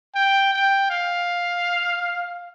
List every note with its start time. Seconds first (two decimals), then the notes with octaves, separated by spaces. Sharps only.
0.15 G5
0.53 G5
0.90 F5